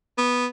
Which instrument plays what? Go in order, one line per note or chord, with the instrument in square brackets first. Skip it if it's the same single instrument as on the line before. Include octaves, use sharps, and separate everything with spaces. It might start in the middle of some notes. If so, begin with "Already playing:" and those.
[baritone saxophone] B3